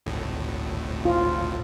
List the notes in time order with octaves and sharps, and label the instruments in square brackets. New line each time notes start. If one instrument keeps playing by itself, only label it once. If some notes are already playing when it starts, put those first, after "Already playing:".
[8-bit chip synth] G#1 D2 A2
[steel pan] F4